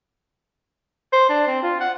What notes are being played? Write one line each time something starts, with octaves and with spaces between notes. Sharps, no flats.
C5
D4
C4
F4
F#5